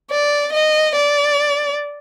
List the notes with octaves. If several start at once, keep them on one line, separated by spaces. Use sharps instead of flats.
D5
D#5
D5